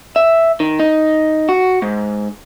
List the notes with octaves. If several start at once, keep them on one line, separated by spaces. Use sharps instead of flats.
E5
D#3
D#4
F#4
G#2